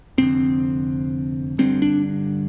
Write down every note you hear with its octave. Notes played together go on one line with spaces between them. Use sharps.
F1 F2 D3 C4
G1 G2 D3 C4
D4